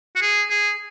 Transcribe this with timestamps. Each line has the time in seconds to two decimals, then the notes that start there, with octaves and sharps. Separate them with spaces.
0.16 F#4
0.22 G#4
0.50 G#4